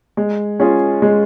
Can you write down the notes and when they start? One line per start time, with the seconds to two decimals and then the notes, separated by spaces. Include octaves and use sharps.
0.17 G#3
0.60 C#4 F4 G#4
1.02 G#3